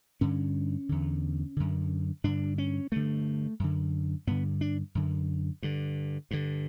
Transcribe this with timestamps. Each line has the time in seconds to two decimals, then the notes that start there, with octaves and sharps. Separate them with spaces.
0.21 G2 D3 C#4
0.89 E2 D3
1.56 F#2 D3
2.24 G2 D3 D4
2.58 C#4
2.92 G2 D3 A3
3.60 F#2 D3
4.27 G2 D3 B3
4.61 D4
4.95 F#2 D3
5.62 G2 D3
6.31 G2 D3